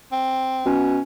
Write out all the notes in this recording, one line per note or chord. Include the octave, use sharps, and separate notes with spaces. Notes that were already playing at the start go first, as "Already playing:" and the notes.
C4
B2 C#4